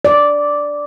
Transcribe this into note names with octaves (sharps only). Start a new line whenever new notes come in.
D5